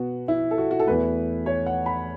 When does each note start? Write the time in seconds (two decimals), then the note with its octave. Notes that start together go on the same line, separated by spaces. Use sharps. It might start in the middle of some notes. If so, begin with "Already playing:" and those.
Already playing: B2 B3 F#4
0.28 E4
0.51 A4
0.58 F#4
0.71 F#4
0.80 A4
0.87 E2 E3 A3 B4
1.46 C#5
1.66 F#5
1.86 B5